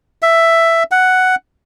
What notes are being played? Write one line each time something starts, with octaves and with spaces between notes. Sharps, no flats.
E5
F#5